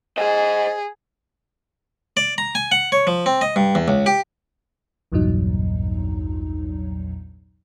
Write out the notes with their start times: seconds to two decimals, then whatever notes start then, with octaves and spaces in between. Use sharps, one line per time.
0.18 G#4 C5 D#5
2.17 D5
2.38 A#5
2.55 G#5
2.72 F#5
2.92 C#5
3.07 F3
3.26 C4
3.41 D#5
3.56 G2
3.75 E2
3.88 C#2
4.06 G4
5.12 A#1 E2 G2 A#2 F#3 D#4